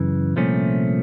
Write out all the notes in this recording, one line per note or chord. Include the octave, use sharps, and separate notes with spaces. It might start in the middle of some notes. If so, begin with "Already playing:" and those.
Already playing: F#2 C#3 E3
C2 A#2 F3 A3 C#4